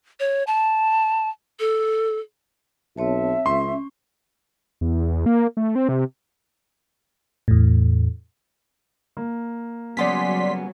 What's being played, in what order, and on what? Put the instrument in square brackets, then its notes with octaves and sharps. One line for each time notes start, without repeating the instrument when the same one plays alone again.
[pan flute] C#5
A5
A4
[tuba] B1 [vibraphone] C4 C#5 A5 [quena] E5
[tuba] C#2 [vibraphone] C#4 [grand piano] C6
[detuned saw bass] E2
A#3
A3
C4
C3
[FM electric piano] E2 A2
[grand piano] A#3
[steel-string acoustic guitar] C#3 B3 C#4 [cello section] F#3 G3 [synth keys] D5 C6 B6